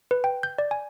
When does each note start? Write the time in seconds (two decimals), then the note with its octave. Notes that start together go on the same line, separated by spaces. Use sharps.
0.11 B4
0.24 G5
0.43 G6
0.58 D5
0.71 G#5